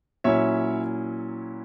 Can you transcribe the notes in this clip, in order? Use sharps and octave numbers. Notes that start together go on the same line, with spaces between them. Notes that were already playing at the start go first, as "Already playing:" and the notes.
A#2 F#3 C#4 E4 C#5 E5